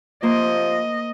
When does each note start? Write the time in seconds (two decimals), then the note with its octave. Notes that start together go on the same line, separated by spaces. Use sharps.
0.23 C3 F3 A#3 A#4 C5 D#5